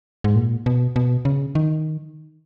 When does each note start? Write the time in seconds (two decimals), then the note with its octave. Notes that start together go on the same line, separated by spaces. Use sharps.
0.24 G#2
0.36 A#2
0.66 B2
0.96 B2
1.25 C#3
1.55 D#3